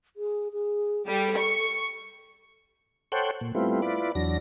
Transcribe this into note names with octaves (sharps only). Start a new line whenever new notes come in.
G#4
G#4
G3 A4
C#6
A4 C5 C#5 F#5 G5
A#2
G3 A3 B3 C4 E4 F4
E4 F4 B4 D5
E2 F#3 D4 A#6